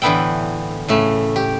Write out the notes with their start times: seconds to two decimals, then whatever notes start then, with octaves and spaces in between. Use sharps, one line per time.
0.02 A2 D3 E3 B3 A4 G5
0.88 A2 C#3 A3
1.36 G4